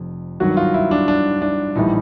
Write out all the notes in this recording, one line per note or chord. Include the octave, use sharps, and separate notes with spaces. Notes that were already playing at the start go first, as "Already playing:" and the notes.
Already playing: F1 F2
G#1 G2 D#3 F#3 F#4
F4
E4
D4
D4
D4
A#1 A2 E3 G3 D#4